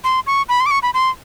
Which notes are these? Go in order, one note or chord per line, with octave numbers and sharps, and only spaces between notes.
C6
C#6
B5
C6
D6
C#6
B5
C6